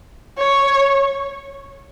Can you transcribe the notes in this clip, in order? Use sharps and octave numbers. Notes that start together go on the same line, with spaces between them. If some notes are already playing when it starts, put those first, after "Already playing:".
C#5